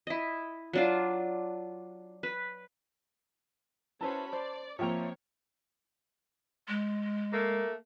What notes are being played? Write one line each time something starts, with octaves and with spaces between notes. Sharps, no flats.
E4 D#5
F#3 D4 F4
B4
C#4 E4 F#4 B4 C5 A5 B5
C5 D5
F3 A#3 C4 C#5 E5 G5 A#5
G#3
A3 A#3